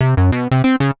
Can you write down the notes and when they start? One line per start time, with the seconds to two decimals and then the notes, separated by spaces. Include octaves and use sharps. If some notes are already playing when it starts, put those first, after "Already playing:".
0.01 C3
0.17 F#2
0.32 B2
0.51 C3
0.64 C4
0.80 C#3